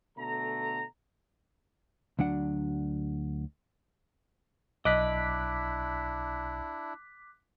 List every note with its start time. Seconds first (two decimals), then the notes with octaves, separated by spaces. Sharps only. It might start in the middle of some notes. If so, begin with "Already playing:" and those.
0.18 B2 D3 A3 A#5
2.19 D2 F#3 D4 F#5
4.85 B1 D4 E4 D#5 D6 F#6 B6